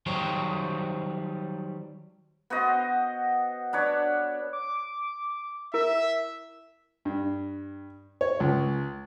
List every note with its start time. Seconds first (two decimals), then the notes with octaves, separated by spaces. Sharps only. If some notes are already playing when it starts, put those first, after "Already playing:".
0.06 D#3 F#3 G3 C5 C#5 G5
2.50 B3 F#4 C5 D#5
3.73 D4 B4 C#5
4.53 D6
5.74 E4 A#4 E5
7.05 G2
8.21 C#5
8.40 C#2